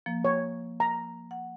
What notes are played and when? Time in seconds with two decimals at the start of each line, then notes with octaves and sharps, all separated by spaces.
0.06 F3 A#3
0.25 C#5
0.80 A#5
1.31 F#5